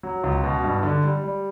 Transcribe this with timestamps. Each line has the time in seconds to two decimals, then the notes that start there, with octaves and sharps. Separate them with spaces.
0.03 F#3
0.24 C#2
0.44 B2
0.64 G2
0.83 D3
1.04 G3
1.24 G3